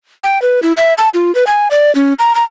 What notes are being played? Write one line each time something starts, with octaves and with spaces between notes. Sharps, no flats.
G5
B4
E4
E5
A5
F4
B4
G#5
D5
C#4
A#5
A#5